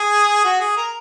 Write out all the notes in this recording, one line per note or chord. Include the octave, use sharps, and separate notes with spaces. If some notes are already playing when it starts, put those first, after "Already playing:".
Already playing: G#4
F#4
G#4
A#4